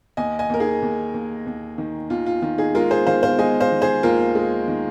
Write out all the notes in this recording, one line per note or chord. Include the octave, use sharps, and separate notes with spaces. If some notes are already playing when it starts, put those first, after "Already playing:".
D#2 D#5 G#5
D#5 G#5
D#2 A#4
D#4 G#4
D#2
D#2
D#2
D#3
D#2 F4
F4
D#3 F4
D#4 G#4
G#3 F4 A#4
G#4 C5
D#3 C5 F5
C5 F5
G#3 D#5 G#5
C5 F5
D#3
G#4 C5
D#2 F4 A#4
G#3
D#3